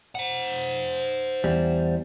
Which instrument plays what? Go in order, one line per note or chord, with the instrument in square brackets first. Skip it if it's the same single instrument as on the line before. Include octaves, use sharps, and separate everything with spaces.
[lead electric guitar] C5 F#5
[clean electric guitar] E2 G3